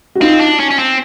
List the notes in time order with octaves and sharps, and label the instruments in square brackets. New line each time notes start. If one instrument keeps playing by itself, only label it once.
[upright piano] F#4
[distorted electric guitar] C4 [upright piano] D#4 F4
[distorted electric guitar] D4
C#4
C#4
C4